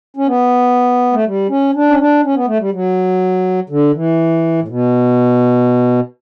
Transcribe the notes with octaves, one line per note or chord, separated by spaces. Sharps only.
C#4
B3
A3
G3
C#4
D4
C#4
D4
C#4
B3
A3
G3
F#3
D3
E3
A2
B2